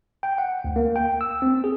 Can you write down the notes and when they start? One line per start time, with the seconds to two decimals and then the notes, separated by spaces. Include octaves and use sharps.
0.23 G5
0.38 F#5
0.64 D2
0.76 A#3
0.96 G5
1.21 E6
1.42 C4
1.64 G#4